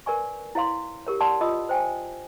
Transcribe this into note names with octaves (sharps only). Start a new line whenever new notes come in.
A#4 B4 D5 G#5 C#6
E4 C#5 F5 C6
G4 A#4 C#5
D5 F#5 A5 C6
F4 D#5 D#6 E6
C5 G5 G#5